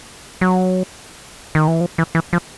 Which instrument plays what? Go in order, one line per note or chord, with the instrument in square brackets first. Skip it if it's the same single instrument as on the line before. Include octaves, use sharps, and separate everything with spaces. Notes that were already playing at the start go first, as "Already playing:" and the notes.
[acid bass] F#3
D#3
E3
F3
E3
E3
F3